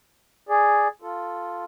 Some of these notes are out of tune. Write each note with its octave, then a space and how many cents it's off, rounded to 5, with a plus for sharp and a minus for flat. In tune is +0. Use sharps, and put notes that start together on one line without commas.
G#4 +0 D5 +0
F4 +0 A4 +0